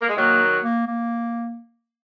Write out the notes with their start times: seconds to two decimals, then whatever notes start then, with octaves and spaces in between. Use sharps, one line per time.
0.02 A#3
0.09 G#3
0.16 D#3 F#3 A#3
0.63 A#3
0.87 A#3